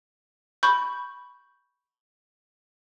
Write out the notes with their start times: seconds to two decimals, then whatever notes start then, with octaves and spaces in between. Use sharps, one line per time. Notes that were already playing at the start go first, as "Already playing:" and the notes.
0.63 B5 C#6 G6